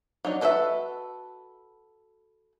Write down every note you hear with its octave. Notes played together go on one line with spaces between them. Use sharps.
F#3 D4 D#4
F#4 A4 B4 D5 E5